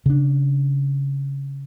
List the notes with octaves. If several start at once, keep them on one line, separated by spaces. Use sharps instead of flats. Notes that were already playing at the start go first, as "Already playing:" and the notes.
C#3 D4